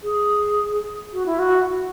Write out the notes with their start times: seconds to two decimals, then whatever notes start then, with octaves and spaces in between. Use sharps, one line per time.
0.03 G#4
1.13 F#4
1.26 E4
1.39 F#4